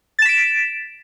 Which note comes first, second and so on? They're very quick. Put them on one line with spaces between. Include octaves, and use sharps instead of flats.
A6 E7 B6 D7